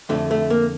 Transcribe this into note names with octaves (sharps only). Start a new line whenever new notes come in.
F2 D3 A3
A3
A#3